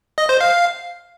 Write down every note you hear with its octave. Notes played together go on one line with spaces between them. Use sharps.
D#5
C5
F5